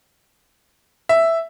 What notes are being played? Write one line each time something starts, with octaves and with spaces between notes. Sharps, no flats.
E5